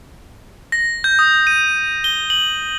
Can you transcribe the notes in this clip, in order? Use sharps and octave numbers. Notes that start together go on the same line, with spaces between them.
A#6
G6
D#6
D#7
G7
F#7